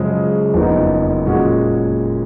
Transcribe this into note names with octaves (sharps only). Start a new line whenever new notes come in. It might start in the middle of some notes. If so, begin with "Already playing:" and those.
Already playing: F#2 C#3 F3 G#3
F#1 F2 F3 B3 D#4
A#2 G#3 C#4 F#4